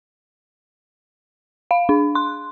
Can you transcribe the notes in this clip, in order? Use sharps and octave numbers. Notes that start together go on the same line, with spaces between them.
F5
D4
C6